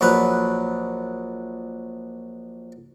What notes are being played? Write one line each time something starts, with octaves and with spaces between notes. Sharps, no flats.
A#1 F#3 B4